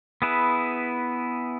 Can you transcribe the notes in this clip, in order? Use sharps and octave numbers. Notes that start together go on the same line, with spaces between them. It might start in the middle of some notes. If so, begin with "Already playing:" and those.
B3 E4 G#4 B4